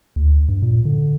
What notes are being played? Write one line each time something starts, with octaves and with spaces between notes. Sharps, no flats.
D2
G2
A#2
D3